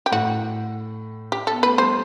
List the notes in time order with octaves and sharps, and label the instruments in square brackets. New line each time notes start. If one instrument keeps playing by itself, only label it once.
[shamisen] G4
[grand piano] A2 A3 [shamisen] F#4
[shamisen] G4
[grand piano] B3 [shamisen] A4
[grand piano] A3 [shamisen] B4
[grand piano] G3 [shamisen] C5